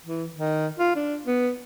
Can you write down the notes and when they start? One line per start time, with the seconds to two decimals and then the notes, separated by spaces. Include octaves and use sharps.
0.06 E3
0.36 D#3
0.79 F4
0.95 D4
1.26 B3